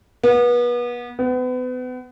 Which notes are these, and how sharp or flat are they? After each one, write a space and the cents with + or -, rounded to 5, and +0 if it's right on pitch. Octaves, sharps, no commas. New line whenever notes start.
B3 -30
B3 +35